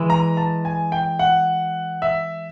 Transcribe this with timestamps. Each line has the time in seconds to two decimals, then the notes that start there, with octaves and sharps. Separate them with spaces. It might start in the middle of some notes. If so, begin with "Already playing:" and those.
Already playing: E3 G#3
0.10 A#5
0.37 A5
0.65 G#5
0.92 G5
1.19 F#5
2.02 E5